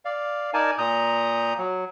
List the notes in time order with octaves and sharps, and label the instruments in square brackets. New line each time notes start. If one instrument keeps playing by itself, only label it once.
[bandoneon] D5 F5
D#4 A#4 D5 G#5 A5
A#2 A#5 D#6 G6
F#3